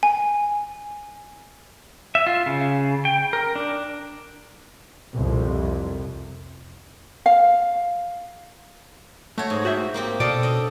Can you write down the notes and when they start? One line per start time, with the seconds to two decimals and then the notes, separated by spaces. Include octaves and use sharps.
0.03 G#5
2.15 E5
2.27 F4
2.46 C#3
3.05 G5
3.33 A#4
3.56 D4
5.13 C2 F2
7.26 F5
9.38 A3 F#4 C#5
9.50 G#2
9.65 F#4 C5 E5
9.94 A#3 C4 G4
10.20 B2 A4 D5 D#5 F5
10.43 D4 D#5